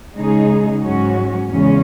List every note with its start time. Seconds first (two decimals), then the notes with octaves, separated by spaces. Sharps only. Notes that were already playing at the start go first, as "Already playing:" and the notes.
0.16 C#3 G#3 D#4 G#4
0.83 G#2 F#3 C#4 F#4
1.49 E2 C#3 G#3 C#4